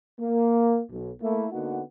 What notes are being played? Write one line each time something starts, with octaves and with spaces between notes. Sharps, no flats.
A#3
B1
A3 A#3 E4
D3 A#3 B3 D#4 F#4 F#5